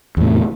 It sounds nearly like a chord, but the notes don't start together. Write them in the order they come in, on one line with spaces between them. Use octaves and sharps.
E2 A2 C3